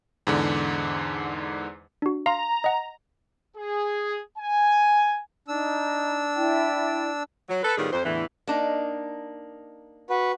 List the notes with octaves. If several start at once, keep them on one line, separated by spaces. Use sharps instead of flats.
E2 G#2 D3
D4 F#4
F5 A#5 C6
D#5 F#5
G#4
G#5
D4 D#4 E6
E4 D5 G5
F#3
A4 B4
A2 D#3 G3 B3 F4 G#4
F2 C5
E2 A2 D3 E3
A#3 D4 D#4
F#4 B4